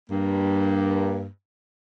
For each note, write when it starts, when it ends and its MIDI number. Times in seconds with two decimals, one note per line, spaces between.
0.10 1.26 43
0.10 1.26 58